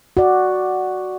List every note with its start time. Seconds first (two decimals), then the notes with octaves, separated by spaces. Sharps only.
0.17 F#4 D5